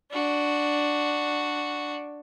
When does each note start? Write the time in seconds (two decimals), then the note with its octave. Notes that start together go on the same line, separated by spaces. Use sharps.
0.11 D4 F#4